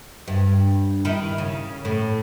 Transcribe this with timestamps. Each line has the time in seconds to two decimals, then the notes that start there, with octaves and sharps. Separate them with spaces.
0.28 G2
1.05 D#3 E4
1.38 C#3
1.85 A2